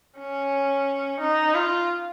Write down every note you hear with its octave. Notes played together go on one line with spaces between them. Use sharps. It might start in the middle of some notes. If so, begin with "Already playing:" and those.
C#4
D#4
F4